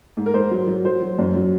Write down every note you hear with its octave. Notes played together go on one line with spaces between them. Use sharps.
G#2
A#4
G#2 C5
F#3
F#3
F#3 C5
F#3
F#2
F#3